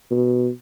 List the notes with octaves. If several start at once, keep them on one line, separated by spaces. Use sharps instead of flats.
B2